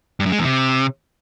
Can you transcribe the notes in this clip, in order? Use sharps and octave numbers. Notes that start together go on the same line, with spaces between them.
G2
F#2
G#3
E2
C3